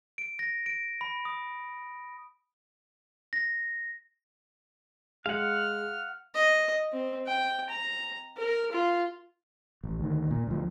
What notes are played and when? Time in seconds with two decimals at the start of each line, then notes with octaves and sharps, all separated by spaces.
0.18 D7
0.39 A#6
0.66 D7
1.01 B5
1.25 D#6
3.33 A#6
5.26 G#3 F5 F#5 F6
6.35 D#5
6.92 C4
7.26 G5
7.69 A#5
8.37 A#4
8.72 F4
9.84 A1
9.99 D2 D#3
10.31 A#2
10.47 D2 F3